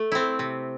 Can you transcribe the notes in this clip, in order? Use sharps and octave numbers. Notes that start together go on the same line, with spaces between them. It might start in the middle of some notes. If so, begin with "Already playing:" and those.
Already playing: A3
C4 E4
C3